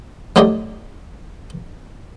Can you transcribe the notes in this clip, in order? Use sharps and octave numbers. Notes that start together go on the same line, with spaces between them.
F#3 A3 D#4 G4 D5 D#5